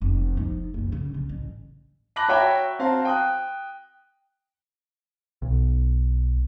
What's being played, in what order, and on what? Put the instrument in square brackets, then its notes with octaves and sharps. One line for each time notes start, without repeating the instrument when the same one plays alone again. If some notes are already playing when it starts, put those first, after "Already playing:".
[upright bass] F1
F3 D#4
F#1 F2
C#3
C#3
A1
[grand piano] A5 B5 D6 F#6 A#6 F#7
F#4 C#5 E5 G5 A#5 B5
C4 F#4 F5 A5 A#5
G5 D#6 F#6
[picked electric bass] B1